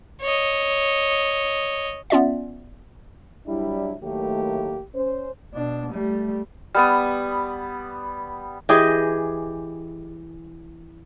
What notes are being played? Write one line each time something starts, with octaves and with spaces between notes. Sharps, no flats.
C#5 D#5
B3 C#4 F4 D5 E5
F#3 G3 D4 E4
A2 D#3 F#3 A3 A#3 G4
C#4 C5
B2 D4
G3 A3
G3 B3 D#6
E3 G4 G#4 D#5